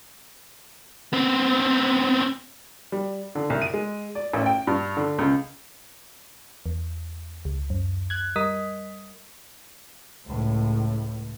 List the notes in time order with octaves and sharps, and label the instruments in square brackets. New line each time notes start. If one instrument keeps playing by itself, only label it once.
[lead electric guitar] B3 C4
[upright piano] G3
D3
C2
D#7
G#3
D5
A1
G5
G2
D3
C#2
[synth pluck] E2
C#2
F#2
F#6 G#6
G3 A#4 D#5 D#6 B6
[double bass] C#2 A2